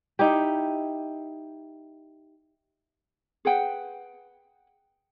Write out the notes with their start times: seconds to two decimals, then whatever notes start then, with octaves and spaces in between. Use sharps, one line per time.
0.19 D#4 E4 G4
3.45 G#4 B4 F#5 G5